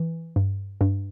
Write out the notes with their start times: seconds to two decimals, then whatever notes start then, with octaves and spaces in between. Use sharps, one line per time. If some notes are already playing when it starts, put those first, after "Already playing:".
Already playing: E3
0.36 G2
0.81 G2